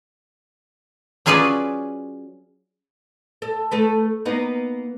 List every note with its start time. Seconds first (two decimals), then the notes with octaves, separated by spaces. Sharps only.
1.26 F#3 C#4 F4 G#4 B4 D5
3.42 A4
3.71 A3 A4 B4
4.25 A#3 B3 D#4